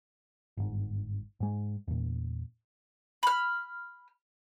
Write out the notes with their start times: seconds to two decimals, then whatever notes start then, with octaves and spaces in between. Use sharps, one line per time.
0.57 G1 G#2
1.40 G#2 G#3
1.88 E2 A#2
3.23 B5 F6